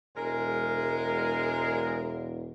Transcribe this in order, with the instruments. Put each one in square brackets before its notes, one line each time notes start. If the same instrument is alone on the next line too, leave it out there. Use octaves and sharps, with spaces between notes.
[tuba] E1 [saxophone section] G#3 A#4